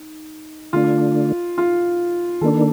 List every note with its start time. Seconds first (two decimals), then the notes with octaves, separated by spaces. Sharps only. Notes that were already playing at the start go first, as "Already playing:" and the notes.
Already playing: D#4
0.73 D3 A3 D4 F4
1.58 F4
2.41 D#3 A#3 D4 A4